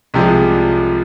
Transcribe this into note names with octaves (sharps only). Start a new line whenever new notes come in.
C2 C3 F3 G#3